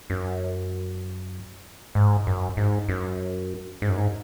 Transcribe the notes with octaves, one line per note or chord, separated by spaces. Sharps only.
F#2
G#2
F#2
G#2
F#2
G#2
F#2
G#2